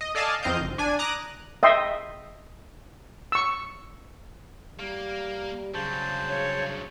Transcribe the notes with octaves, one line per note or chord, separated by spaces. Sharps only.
D#5
A4 D5 D#5 F5 G#5 A5
F2 C4 D#5 F5 G6
G1
D4 G#5
A#5 D6 D#6 F#6 A#6
D#5 E5 G5 C6
C#6 E6
G3 A#3
G2 C#3 F#3 C5 A5
C#5